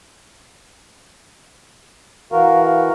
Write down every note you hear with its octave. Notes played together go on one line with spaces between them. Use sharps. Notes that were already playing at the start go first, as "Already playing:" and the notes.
E3 F#4 A#4 F5